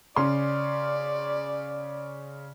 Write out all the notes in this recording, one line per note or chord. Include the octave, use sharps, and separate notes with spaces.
C#3 C#4 D5 C6